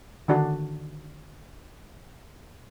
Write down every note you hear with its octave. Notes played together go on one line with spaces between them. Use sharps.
D3 D#3 D4 F#4